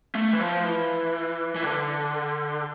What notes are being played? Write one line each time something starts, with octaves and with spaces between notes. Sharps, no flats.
A3
E3
F3
E3
E3
D3